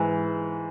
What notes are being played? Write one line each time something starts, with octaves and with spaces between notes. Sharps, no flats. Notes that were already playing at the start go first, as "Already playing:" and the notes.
Already playing: G#2 E3